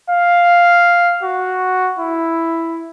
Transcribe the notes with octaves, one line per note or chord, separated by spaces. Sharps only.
F5
F#4
E4